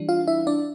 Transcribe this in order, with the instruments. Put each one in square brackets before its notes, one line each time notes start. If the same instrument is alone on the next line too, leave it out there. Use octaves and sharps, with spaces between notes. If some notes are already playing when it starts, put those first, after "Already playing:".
Already playing: [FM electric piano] E3 G3 D4
F4 F5
E4 E5
D4 D5